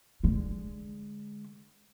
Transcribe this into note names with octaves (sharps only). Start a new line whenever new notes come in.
D3 G#3